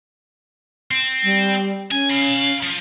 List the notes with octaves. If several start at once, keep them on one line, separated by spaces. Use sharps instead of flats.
C4
G3
C#4 G#5
F5 B5
F3